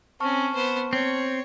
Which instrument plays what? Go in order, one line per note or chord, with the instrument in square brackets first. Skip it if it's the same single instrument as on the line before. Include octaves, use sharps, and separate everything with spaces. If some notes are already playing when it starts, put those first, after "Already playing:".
[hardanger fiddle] C4 C#4 [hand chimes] A5 C#6 F6
[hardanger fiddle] B3 C5
[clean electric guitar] C4 [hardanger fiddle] C#5